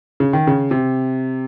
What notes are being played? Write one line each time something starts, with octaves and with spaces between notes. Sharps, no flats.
C#3
D#3
C#3
C3